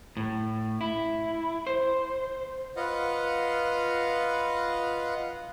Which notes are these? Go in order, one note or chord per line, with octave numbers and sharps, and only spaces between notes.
A2
E4
C5
F4 B4 D#5 F5 F#5